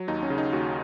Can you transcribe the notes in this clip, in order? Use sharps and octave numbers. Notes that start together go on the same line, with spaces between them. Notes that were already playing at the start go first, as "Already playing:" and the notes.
Already playing: F#3
D#2 D#4
C#4
C#3
D#4
D#2 F#4